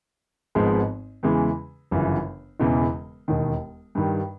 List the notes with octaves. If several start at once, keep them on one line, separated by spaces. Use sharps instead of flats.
G#1 G#2 F3 G#3 B3
E2 C#3 E3 G#3
G1 F#2 C#3 E3
E1 E2 C#3 E3
E1 D#2 D#3
G2 D#3 G3